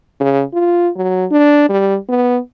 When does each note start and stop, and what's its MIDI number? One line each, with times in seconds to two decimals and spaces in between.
0.20 0.43 49
0.53 0.89 65
0.96 1.25 54
1.31 1.67 62
1.69 1.96 55
2.09 2.38 59